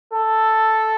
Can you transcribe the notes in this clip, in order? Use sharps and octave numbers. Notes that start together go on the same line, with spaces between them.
A4